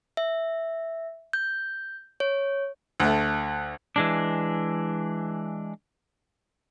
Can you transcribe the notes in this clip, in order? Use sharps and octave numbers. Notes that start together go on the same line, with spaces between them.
E5
G6
C#5
D2 A3
E3 G#3 D4